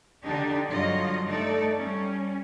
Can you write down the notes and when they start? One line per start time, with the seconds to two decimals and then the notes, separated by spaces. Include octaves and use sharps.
0.24 D3 D4 D#4 G4 D5
0.69 G2 D3 F#3 F4 D#5
1.28 A3 D#4 A4 D5
1.78 G3 C#4